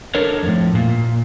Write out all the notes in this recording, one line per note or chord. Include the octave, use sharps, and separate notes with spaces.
D4 A4 A#4 C#5
F2 A2
A#2